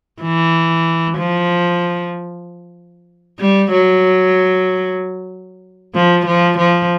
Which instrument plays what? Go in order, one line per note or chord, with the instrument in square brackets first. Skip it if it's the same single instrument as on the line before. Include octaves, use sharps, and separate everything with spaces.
[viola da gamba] E3
F3
G3
F#3
F3
F3
F3